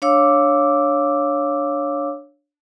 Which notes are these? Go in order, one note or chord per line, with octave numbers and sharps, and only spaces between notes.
D4 C#5 F5 D6 E6